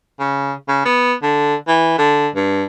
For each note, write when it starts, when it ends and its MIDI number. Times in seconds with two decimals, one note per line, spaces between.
0.20 0.53 49
0.69 0.80 49
0.85 1.13 59
1.23 1.54 50
1.67 1.95 52
1.98 2.28 50
2.35 2.65 43